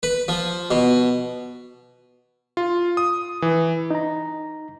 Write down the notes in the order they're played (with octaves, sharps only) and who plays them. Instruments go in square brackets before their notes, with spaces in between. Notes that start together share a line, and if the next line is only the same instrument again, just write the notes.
[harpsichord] B4
F3
B2
[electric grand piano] F4
D#6
E3
[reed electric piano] D#4 A#5